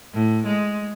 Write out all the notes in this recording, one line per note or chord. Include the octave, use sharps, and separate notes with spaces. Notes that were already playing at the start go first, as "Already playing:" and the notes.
A2
G#3